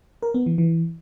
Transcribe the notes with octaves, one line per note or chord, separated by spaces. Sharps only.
A#4
B3
E3
E3